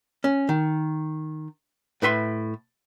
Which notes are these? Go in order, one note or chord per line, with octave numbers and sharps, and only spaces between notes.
C#4
D#3
A2 B4 E5 C6